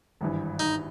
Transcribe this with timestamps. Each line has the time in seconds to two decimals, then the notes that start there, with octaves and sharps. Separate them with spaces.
0.21 G#1 G2 E3
0.59 D#4